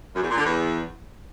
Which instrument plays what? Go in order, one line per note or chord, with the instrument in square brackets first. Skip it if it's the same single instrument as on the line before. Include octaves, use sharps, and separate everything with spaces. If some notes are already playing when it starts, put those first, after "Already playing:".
[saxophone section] F#2
E2
A#2
D3
E2